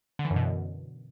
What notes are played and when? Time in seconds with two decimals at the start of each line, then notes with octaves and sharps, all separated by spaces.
0.19 D3
0.25 E3
0.31 F#2
0.36 B2
0.42 F#2